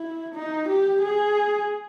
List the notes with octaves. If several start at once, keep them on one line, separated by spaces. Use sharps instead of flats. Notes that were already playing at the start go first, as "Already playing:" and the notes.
Already playing: E4
D#4
G4
G#4